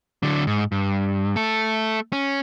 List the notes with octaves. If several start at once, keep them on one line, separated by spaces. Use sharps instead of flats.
D3 F#3
G#2
G2
A3 A4
C#4